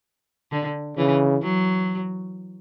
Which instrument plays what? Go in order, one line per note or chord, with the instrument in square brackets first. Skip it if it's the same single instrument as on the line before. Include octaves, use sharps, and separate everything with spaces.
[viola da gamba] D3
[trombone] C#3 [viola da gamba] E3
[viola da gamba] F#3